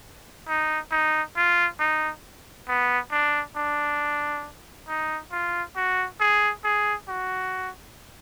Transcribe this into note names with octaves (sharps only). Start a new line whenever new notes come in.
D#4
D#4
F4
D#4
B3
D4
D4
D#4
F4
F#4
G#4
G#4
F#4